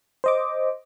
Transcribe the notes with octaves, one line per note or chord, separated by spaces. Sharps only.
C5 D#5 D6